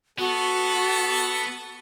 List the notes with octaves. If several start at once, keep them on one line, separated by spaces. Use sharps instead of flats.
B3 F#4 A4